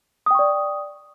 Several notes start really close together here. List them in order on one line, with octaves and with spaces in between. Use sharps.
D#6 G5 C#6 D5